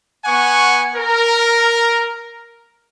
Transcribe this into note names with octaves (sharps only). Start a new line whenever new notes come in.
B3 F#5 G#5 C#6
A#4